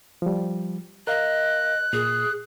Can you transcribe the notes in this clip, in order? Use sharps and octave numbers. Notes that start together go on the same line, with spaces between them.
F3 G3
A#4 D#5 F5 F#6
A#2 G#4